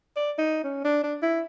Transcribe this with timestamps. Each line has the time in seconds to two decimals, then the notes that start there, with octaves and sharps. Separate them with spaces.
0.17 D5
0.38 D#4
0.64 C#4
0.85 D4
1.03 D4
1.22 E4